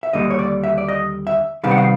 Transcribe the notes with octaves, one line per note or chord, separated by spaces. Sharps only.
E5
D#2 D3 G3 A#3 D#5
C#5
D5
E5
D5
D#5
E5
C3 D#3 G3 B3 D4 F5
F#5
F5